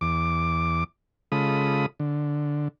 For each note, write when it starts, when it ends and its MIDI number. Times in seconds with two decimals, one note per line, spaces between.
0.01 0.84 40
0.01 0.84 86
1.32 1.86 49
1.32 1.86 56
1.32 1.86 65
1.32 1.86 69
1.32 1.86 83
1.32 1.86 87
2.00 2.68 50